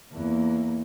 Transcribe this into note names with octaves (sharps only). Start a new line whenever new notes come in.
E2 A#3